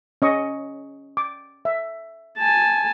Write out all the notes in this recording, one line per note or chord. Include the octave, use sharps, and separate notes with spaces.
C#4 D#5 C#6
D6
E5
G#5 A5